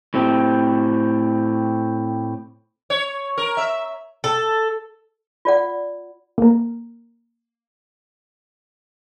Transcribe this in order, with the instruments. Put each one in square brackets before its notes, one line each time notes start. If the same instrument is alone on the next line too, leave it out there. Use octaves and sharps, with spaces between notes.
[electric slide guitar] A2 C4 G4
[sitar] C#5
A#4
E5
[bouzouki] A4
[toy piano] F4 D5 F#5
[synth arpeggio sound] A#3 A#4